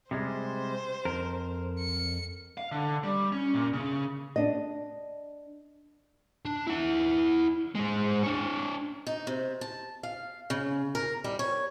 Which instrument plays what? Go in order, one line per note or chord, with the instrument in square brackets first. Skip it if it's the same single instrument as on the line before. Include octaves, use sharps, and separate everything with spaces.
[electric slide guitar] C3 G3 G#3 [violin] C5
[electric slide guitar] F2 A#4
[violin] C#7
[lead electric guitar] F5
D3
G3
C#4
A#2
C#3
[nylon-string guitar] D4 D#5
[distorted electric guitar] D4
E4 F#5
G#3 C5
D4 C#5
[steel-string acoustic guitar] D#4
C3
A5
F5
C#3
A#4
G3
C#5